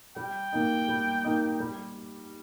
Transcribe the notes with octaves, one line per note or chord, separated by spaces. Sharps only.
G3 G5
A#3 D#4
G3
A#3 D#4
G3